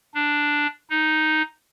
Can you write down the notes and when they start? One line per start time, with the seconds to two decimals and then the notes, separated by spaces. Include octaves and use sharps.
0.15 D4
0.90 D#4